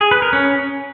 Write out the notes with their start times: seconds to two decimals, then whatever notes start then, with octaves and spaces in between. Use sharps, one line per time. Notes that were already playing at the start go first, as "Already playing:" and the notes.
0.01 G#4
0.11 B4
0.22 A#4
0.33 C#4